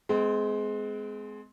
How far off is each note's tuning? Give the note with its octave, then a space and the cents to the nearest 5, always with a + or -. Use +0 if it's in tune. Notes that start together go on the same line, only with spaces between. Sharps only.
G#3 +20 C4 -35